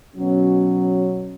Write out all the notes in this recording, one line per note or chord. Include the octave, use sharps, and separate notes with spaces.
B2 F#3 C#4